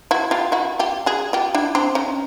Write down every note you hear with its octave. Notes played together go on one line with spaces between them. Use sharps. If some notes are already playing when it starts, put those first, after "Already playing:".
E4 F#4
F4 G4
E4 F#4
F4 G4
F#4 G#4
F4 G4
D4 E4
C4 D4
C#4 D#4